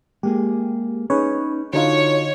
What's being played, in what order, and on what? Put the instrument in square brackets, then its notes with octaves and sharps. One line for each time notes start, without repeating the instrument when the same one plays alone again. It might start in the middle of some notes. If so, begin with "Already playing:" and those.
[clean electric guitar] G#3 A#3 G#4 [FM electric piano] G4
[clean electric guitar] C#4 D#4 [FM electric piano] G#4 B4 C#5
[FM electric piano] D3 D#4 F4 [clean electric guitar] F#4 A4 [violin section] C#5